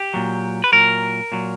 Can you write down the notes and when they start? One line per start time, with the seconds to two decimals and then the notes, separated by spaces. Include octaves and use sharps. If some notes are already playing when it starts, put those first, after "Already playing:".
Already playing: G4
0.14 A#2 F#3
0.64 B4
0.72 A#2 F#3 A#4
1.32 A#2 F#3